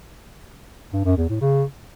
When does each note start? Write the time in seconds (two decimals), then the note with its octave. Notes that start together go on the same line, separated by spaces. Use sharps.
0.93 G2
1.05 F#2
1.17 E2
1.29 A2
1.41 C#3